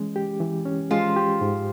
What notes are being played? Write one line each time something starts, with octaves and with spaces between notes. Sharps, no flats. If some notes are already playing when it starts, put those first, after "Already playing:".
Already playing: E3 G#3 C#4
G4
E3
C#4
F3 G#3 F4
G4
G#2